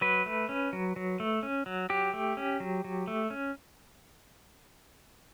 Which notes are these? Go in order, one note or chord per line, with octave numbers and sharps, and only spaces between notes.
F#3 B4
A3
C#4
F#3
F#3
A3
C#4
F#3
F#3 G4
A3
C#4
F#3
F#3
A3
C#4